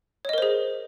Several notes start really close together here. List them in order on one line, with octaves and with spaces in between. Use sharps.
C#5 D#5 A#4 C5 G#4